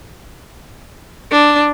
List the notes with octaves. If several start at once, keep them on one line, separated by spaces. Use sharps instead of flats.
D4